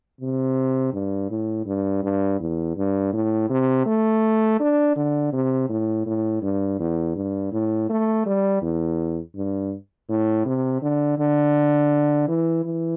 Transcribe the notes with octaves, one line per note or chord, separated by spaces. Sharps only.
C3
G2
A2
G2
G2
E2
G2
A2
C3
A3
D4
D3
C3
A2
A2
G2
E2
G2
A2
A3
G3
E2
G2
A2
C3
D3
D3
E3
E3